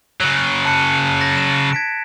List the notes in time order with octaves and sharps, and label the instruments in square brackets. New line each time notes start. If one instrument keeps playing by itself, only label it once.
[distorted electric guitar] C#3 F#3 [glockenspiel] F#6
[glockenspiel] A5 F#6 C#7
A6 A#6
E7
G#6 B6 D7